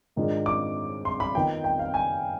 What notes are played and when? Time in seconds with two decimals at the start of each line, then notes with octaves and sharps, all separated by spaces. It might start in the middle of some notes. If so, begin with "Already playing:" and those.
0.16 G#2 D#3 G#3 D4 F4
0.46 D6
1.05 C6
1.20 B5
1.35 D#3 B3 F4 G5
1.64 G5
1.79 F5
1.94 G#5